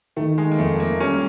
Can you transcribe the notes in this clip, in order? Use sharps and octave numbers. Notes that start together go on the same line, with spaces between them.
D#3 A3
G#3
A#3
F2 A3
A#3
G3 C#4